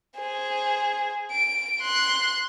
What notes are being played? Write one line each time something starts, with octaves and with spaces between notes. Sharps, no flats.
G#4 C5
D7
C6 F#6